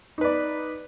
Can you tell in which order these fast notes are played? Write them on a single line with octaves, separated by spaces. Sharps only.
D#4 B4 D5